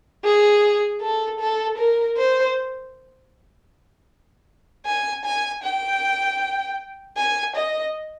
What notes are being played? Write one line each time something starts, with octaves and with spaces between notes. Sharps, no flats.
G#4
A4
A4
A#4
C5
G#5
G#5
G5
G#5
D#5